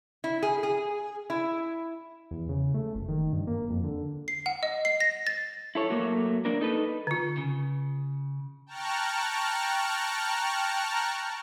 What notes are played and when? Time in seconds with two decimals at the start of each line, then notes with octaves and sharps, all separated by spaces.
0.24 E4
0.43 G#4
0.63 G#4
1.30 E4
2.31 E2
2.49 C#3
2.74 A3
2.95 F#1
3.09 D#3
3.33 G2
3.47 A#3
3.70 F2
3.83 D3
4.28 C7
4.46 F#5
4.63 D#5
4.85 C7
5.00 A#6
5.27 A6
5.75 E4 A4 C#5
5.90 F#3 A3 A#3
6.45 A#3 D4 A#4
6.61 D#4 A4 B4
7.07 D3 F4
7.37 C#3
8.66 G5 A5 A#5 C#6 F6 F#6